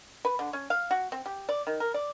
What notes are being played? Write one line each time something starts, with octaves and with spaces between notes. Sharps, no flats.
B4
D3
C#4
F5
F#4
C4
G4
D5
D#3
A#4
D5